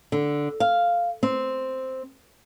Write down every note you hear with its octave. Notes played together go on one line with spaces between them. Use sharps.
D3
F5
C4